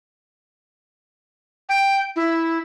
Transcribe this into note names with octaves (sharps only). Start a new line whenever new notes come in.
G5
E4